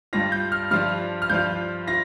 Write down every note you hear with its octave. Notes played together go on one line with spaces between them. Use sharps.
G2 G3 D4 F4 A#6
G6
F6
G2 F3 D4 F4 F6
F6
G2 F3 D4 F4 G6
F4 A#6